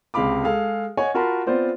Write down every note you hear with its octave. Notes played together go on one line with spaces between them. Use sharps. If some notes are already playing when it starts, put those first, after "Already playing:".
C#2 C3 G#3 F5 B5 D6
G#3 G#4 A4 F5
C#5 D#5 F#5 G#5
F4 F#4 A#4 A5 B5 C6
B3 C4 F4 C5 D5